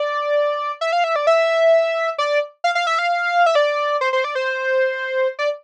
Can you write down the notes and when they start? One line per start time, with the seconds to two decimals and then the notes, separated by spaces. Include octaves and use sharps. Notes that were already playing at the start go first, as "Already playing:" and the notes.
Already playing: D5
0.81 E5
0.92 F5
1.04 E5
1.16 D5
1.27 E5
2.18 D5
2.64 F5
2.75 F5
2.87 E5
2.99 F5
3.46 E5
3.55 D5
4.01 C5
4.13 C5
4.24 D5
4.35 C5
5.39 D5